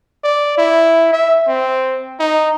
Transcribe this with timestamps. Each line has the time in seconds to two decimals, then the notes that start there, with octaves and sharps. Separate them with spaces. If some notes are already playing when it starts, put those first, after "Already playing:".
0.24 D5
0.58 E4
1.13 E5
1.48 C4
2.19 D#4